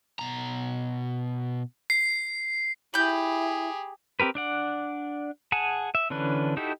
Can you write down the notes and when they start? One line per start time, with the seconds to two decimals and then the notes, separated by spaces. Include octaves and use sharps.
0.19 B2 A#5
1.90 C7
2.94 E4 G4 G#4 B5 G6
4.20 C4 G4 A#4 B4
4.35 D4 D5 F#5
5.52 G#4 F#5 G#5 A5
5.95 E5
6.10 D3 E3 C#4 D4 B4
6.57 D#4 E4 F#4 G4 A4